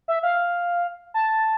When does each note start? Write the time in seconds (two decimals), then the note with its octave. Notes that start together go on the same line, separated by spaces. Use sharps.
0.08 E5
0.23 F5
1.14 A5